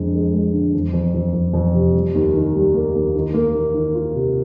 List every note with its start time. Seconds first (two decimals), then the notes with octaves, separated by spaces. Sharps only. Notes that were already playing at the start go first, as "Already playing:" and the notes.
Already playing: F2 D3 G#3
0.14 G#3
0.34 G#3
0.53 D3
0.74 F2
0.93 F2
1.14 F2
1.33 F2
1.53 F2
1.73 C3
1.94 G3
2.14 D#2
2.34 D#3
2.54 G3
2.74 A#3
2.95 D#2
3.15 D#3
3.34 A#3
3.55 D#3
3.74 D#3
3.95 F4
4.15 C3